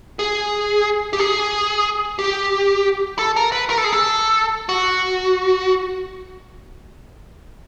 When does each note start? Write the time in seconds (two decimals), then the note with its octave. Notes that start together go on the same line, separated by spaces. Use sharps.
0.19 G#4
1.13 G4
1.19 G#4
2.19 G4
3.19 A4
3.36 A#4
3.52 B4
3.70 A#4
3.78 A4
3.84 G#4
3.93 A4
4.69 F#4